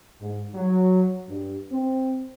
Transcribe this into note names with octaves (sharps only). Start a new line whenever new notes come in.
G#2
F#3
G2
C4